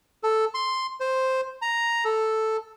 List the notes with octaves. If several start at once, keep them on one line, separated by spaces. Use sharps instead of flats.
A4
C6
C5
A#5
A4